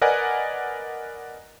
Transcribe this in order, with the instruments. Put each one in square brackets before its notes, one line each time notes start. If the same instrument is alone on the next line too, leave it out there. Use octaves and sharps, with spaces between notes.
[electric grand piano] A#4 B4 D5 D#5 F#5 G#5